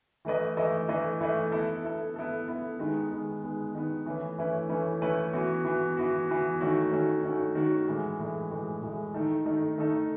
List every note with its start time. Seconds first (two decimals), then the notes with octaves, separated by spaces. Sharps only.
0.25 E3 A3 E4 B4 D#5
0.57 E3 A3 E4 B4 D#5
0.89 E3 A3 E4 B4 D#5
1.21 E3 A3 E4 B4 D#5
1.52 B3 E4 A4
1.84 B3 E4 A4
2.16 B3 E4 A4
2.48 B3 E4 A4
2.79 D#3 G#3 B3
3.11 D#3 G#3 B3
3.43 D#3 G#3 B3
3.75 D#3 G#3 B3
4.06 E3 A3 C#4 E4 B4
4.38 E3 A3 C#4 E4 B4
4.69 E3 A3 C#4 E4 B4
5.02 E3 A3 C#4 E4 B4
5.33 E3 B3 F#4
5.65 E3 B3 F#4
5.97 E3 B3 F#4
6.29 E3 B3 F#4
6.60 D#3 A3 C#4 F#4
6.91 D#3 A3 C#4 F#4
7.23 D#3 A3 C#4 F#4
7.55 D#3 A3 C#4 F#4
7.88 A2 E3 G#3
8.19 A2 E3 G#3
8.50 A2 E3 G#3
8.82 A2 E3 G#3
9.14 D#3 A3 D#4 A4
9.46 D#3 A3 D#4 A4
9.78 D#3 A3 D#4 A4